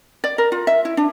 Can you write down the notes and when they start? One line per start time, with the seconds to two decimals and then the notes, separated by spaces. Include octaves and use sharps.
0.24 D5
0.38 A#4
0.52 F4
0.67 E5
0.85 E4
0.97 D4